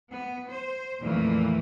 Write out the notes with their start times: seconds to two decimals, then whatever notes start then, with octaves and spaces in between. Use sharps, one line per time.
0.11 B3
0.49 C5
1.01 F2 A#2 E3 F3 A3 A#3